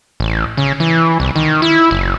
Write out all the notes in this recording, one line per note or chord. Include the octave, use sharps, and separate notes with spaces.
A1
C#3
E3
C2
D#3
E4
F#1